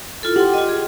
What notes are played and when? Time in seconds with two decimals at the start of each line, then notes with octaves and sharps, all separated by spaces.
0.23 E4 F4 A4
0.36 G4 F#5 G5 C6
0.54 F4 D#5
0.69 G#4